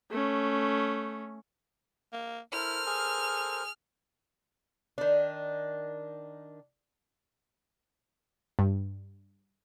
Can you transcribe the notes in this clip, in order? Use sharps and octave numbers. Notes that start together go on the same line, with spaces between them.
A3 C#4
A#3
E4 A4 A#4 C5 F6
G#4
D#3 D4
G2